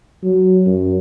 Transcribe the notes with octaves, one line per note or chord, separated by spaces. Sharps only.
F#3
F#2